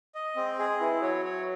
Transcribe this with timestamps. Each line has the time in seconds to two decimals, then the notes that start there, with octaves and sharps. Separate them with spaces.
0.15 D#5
0.36 G#3 C4
0.59 G#3 G#4
0.80 E3 E4
1.02 F#3 C#5
1.25 C#5